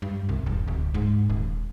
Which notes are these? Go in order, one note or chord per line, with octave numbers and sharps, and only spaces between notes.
G2
C2
E1
D1
G#2
D#1